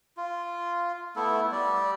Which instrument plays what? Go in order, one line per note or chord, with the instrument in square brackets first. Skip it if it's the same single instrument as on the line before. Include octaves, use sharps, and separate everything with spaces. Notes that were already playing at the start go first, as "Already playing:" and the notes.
[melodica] F4
A3 B3 E4 A4
G3 D5